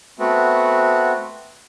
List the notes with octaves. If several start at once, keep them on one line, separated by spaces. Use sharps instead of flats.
A3 B3 C4 F#4